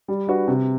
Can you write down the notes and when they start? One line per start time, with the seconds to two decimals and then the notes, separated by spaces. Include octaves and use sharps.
0.08 G3
0.27 D4 F#4 B4
0.48 C3